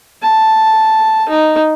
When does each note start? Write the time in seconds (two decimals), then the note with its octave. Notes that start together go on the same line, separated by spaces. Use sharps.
0.22 A5
1.29 D#4